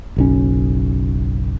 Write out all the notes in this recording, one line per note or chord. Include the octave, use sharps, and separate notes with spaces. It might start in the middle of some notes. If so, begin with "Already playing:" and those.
F#1 B1 C#4